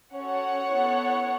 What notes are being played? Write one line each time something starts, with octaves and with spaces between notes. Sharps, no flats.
C#4 F#4 A4 C#5 F#5
B3 E4 A4